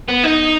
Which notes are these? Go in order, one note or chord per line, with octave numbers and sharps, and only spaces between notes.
B3
D#4